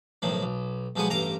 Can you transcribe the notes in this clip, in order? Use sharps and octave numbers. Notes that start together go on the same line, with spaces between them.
B1 A2 D#3 F3
B1
B1 F3 G#3 B3 G#5 C#6
A1 G2 A#5 C6 D6